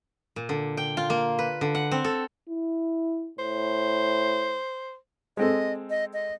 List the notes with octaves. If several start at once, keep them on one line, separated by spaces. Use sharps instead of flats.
A#2
D3
G5
F4
A#3
B4
D3
F#5
C4
A4
E4
A2 C5
G#3 C4 A4 D#5
D#5
D#5